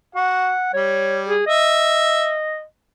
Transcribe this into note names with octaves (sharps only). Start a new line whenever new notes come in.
F#4 F#5
G3 C#5
G#4
D#5 E5